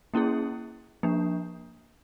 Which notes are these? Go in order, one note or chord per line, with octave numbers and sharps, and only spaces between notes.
A#3 C#4 E4 G#4
F3 A#3 D4